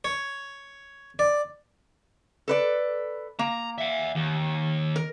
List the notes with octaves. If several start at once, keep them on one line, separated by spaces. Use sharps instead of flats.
C#5
D5
A4 B4 D5
A#3 A#5
E5 F#5
D#2
A#4